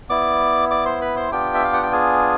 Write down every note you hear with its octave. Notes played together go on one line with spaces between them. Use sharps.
B3 E4 D5 D6
D5 D6
C5 C6
B4 B5
C5 C6
B3 D4 F4 G4 G5
E5
F5
F#5
G5
G#4 G#5